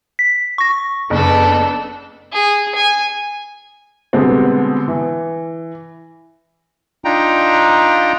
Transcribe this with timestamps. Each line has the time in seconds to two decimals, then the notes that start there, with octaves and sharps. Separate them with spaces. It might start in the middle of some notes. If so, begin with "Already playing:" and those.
0.19 B6
0.58 C#6 A#6
1.10 F#1 B3 D4 A4
2.32 G#4
2.75 G#5
4.13 B2 D3 G3 G#3 B3 C4
4.88 E3
7.05 D4 D#4 F4 G5 A#5